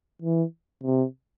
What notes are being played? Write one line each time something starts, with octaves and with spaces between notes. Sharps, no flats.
E3
C3